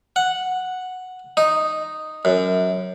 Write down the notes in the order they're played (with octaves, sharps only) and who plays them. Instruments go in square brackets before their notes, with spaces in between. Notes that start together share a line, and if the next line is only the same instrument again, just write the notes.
[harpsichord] F#5
D#4
F#2